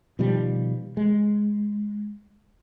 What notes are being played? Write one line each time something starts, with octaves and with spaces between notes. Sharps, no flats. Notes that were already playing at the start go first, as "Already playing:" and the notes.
B2 D#3 F3 G3
G#3